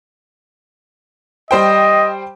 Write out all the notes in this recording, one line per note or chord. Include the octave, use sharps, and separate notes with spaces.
G3 C5 D#5 G5